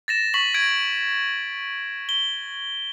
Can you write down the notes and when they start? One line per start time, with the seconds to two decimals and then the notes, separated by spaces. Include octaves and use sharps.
0.08 A6 A#6 E7
0.34 C#6 B6 F#7
0.54 G#6 A#6 D7
2.09 G7